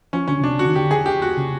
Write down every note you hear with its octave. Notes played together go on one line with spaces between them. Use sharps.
F3 C#4
D3 C#4
C#3
C3 D4
C#3 F#4
D#3
D3 G4
G#4
G4
F#4
C#3